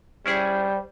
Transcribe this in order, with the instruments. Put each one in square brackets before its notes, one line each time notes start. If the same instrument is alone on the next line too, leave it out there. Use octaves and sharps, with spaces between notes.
[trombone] G3 [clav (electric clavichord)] C#4 E4 G#4 [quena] C5